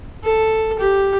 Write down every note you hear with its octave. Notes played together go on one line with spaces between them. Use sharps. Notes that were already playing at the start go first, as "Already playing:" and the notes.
A4
G4